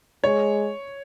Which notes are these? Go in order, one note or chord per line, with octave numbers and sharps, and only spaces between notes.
G#3 C#5